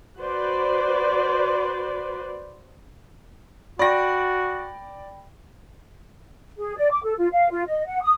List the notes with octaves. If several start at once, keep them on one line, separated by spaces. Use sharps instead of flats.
F#4 B4 C5 D5
F#4 D5 G5 B5 A#6
G#4
D5
D6
A4
F4
F5
F4
D#5
F#5
D#6